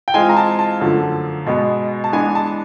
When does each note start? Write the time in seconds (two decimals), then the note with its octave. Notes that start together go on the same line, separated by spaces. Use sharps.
0.08 G5
0.14 E3 G#3 C4 F4 G#5
0.29 A#5
0.37 A5
0.59 A5
0.80 F#2 D3 F3 A3
1.46 B2 G#3 B3
2.04 A5
2.13 E3 G#3 B3 D4 G#5
2.35 A5